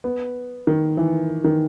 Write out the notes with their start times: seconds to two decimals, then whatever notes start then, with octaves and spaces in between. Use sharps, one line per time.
0.04 B3
0.67 D#3
0.97 E3
1.44 D#3